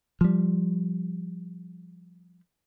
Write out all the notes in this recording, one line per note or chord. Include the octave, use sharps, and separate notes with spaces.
F3 G3